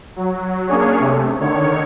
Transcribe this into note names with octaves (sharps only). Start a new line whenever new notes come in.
F#3
A#3 C#4 D4 G#4 C#5
C3 A3
D3 D#3 C#5